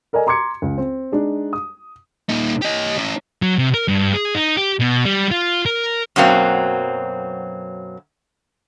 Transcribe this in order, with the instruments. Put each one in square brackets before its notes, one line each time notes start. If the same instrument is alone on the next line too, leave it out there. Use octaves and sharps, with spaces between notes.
[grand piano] A4 A#4 D5 D#5 G#5
A#5 C6 D6 G#6 C#7
C#2
C4
G#3 D4 D#4
D#6
[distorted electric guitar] A#2 D#4
G4 D#5
C#4 E4
F#3
C3
A#4
G2
G#4
D#4
G4
B2
G3
F4
A#4
[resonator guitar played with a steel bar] F#2 B2 F#3 A#3 C4